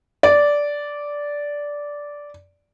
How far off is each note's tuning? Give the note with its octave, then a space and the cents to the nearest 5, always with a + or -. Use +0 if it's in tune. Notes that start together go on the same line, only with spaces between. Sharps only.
D5 -10